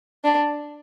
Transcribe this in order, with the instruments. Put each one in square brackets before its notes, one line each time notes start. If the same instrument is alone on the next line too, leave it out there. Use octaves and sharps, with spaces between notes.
[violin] D4